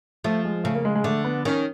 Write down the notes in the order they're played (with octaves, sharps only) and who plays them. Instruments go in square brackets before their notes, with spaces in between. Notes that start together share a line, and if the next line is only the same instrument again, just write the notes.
[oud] F3 [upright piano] A3
[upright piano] G#3
[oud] C#3 [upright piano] A3
[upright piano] A#3
G#3
G#3
[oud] D3 [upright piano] A3
[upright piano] B3
[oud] D#3 [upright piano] C#4